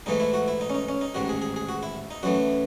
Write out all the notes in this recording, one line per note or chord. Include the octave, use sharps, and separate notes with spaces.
G#2 E3 A3 D#4
E4
F#4
E4
D#4
C#4
D#4
C#4
D#4
A1 G#2 D#3 F#4
G#4
G#4
G#4
F#4
E4
D#4
F#2 E3 A3 F#4